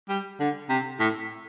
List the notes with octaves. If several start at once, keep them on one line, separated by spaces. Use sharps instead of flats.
G3
D3
C3
A2